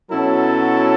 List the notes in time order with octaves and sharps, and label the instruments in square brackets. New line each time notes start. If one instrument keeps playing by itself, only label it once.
[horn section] B2 F#3 C#4 E4 A4